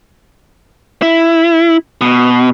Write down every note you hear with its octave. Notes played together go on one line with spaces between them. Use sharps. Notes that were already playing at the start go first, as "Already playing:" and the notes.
E4
B2